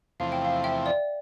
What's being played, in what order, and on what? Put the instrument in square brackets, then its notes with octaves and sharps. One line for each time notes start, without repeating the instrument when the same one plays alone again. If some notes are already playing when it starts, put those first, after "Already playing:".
[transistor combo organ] E2 C3 F3 A3 C4 [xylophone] F5
[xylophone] G5
F5
E5 G5
D5